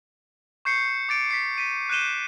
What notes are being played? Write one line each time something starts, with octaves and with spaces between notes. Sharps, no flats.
C#6 G6 C7 C#7
D6 A6 D7
B6 C7
B6 D7 D#7
F#6 G6 D#7 E7 G7